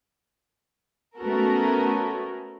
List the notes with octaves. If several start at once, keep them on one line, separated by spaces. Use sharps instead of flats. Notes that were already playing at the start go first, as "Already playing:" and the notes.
A3 B3 C#4 F#4 A4 A#4